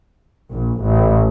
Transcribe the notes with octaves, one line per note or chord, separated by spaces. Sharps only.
A#1
A1